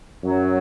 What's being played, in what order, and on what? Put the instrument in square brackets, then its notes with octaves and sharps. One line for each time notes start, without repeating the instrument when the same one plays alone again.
[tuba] F#2 [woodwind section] F#3